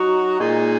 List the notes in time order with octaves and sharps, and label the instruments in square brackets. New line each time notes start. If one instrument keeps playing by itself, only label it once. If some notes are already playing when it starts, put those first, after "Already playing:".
Already playing: [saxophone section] F#3 D#4 F#4
A#2 G#3 D#4 G#4